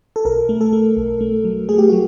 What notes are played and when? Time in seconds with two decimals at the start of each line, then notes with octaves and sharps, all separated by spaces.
0.16 A4
0.25 B1 A#4
0.49 A3
0.61 A4
0.73 A3
0.97 B1
1.21 A3
1.44 F#3
1.69 A3 G#4
1.78 G4
1.89 F#3 F#4